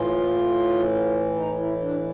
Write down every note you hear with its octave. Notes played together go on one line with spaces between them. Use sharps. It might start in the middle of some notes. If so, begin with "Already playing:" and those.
Already playing: A2 E3 F4
D#4
E4
D4